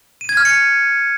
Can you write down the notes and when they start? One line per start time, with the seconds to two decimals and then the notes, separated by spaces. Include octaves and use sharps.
0.21 D#7
0.29 G#6
0.37 F6
0.45 C#7